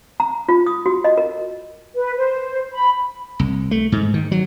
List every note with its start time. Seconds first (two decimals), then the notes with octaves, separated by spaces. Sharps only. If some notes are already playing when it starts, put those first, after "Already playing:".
0.20 A#5
0.49 F4
0.66 D#6
0.86 F#4
1.04 D#5
1.18 A#4
1.95 B4
2.17 C5
2.73 B5
3.39 C2
3.71 A3
3.92 G#2
4.14 D#3
4.32 F#3